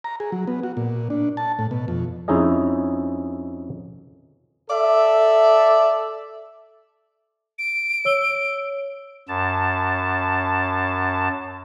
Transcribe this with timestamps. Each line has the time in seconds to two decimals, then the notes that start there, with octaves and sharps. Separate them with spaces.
0.04 A#5
0.20 G#4
0.32 F#3
0.47 B3
0.63 F#4
0.77 A#2
1.10 D4
1.37 A5
1.59 A2
1.71 B2
1.88 F2
2.28 F2 C#4 D#4 E4 G#4 D#5
4.69 A4 D5 E5
7.59 D7
8.05 C#5 E6 G7
9.28 F#2 A5